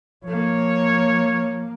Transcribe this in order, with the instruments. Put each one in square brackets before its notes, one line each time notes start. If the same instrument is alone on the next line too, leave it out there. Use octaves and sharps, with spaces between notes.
[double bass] F3 A#3 [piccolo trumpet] C#5